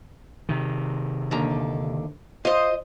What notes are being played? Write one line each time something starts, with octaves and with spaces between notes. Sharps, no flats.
C3 D#3
D#2 D3 A#5
F4 C5 D#5